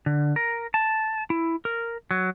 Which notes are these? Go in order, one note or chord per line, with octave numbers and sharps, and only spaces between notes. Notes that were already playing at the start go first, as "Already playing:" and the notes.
D3
A#4
A5
E4
A#4
F#3